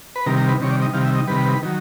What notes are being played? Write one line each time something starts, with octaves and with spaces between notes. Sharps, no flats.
B4
C3 D#3 G3 A#4
A#4
B4
C3 D#3 G3 C#5
D5
D#5
C3 D#3 G3 F5
E5
D#5
C3 D#3 G3 B4
D#3 F#3